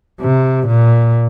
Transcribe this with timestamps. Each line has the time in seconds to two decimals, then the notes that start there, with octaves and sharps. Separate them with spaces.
0.21 C3
0.67 A#2